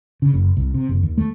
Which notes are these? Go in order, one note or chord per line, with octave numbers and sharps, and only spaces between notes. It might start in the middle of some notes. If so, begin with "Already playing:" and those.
C#3
F#1
C2
C3
F#1
D#2
A3